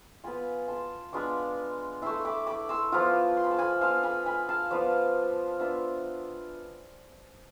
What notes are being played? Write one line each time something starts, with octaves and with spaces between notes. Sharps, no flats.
B3 F4 G#5 B5
A5 C6
G#3 B3 D4 F4 B5 D6
A3 E4 C6 E6
B5 D6
B5 D6
C6 E6
F3 B3 F4 B5 D6
C6
B5
A5
G#5 B5
B3 F4 F5 A5
G#5 B5
G#5 B5
F5 A5
F3 B3 F4 B4 D5
B3 D4 F4 C5 E5